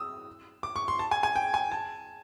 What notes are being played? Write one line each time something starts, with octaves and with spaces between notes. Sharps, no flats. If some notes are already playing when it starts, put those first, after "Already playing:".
Already playing: D#6 E6
D6
C#6
C6
A5
G#5
G#5
G5
G#5
A5